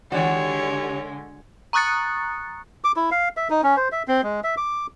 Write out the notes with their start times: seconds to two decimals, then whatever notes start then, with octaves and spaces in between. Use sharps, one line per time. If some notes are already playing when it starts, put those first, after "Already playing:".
0.12 D3 D#3 G#3 F#4 G4 C#5 D5
1.73 A#5 C#6 D#6 F#6 A6 C#7
2.84 D6
2.96 E4
3.11 F5
3.37 E5
3.50 D#4
3.63 C#4
3.77 C5
3.92 E5
4.08 C4
4.23 G#3
4.44 E5
4.57 D6